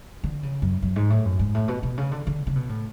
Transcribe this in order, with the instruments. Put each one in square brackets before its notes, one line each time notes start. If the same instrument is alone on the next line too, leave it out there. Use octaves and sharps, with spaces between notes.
[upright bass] D3
C#3
F#2
F#2
G#2
A2
F#2
G#2
A2
B2
B2
C#3
D3
D3
C#3
B2
A2